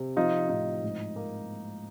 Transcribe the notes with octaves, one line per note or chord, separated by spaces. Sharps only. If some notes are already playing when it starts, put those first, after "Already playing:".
Already playing: C3
F3 D#4 F4
A2 D#4
G#2
A#3